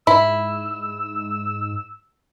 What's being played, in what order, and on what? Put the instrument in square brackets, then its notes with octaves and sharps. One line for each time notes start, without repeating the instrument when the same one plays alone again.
[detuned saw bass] G#2 [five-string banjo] E4 [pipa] B5 [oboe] E6